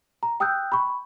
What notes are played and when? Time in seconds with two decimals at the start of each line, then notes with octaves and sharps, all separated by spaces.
0.23 A#5
0.40 G5 D#6 E6 F#6 G6
0.72 B5 C#6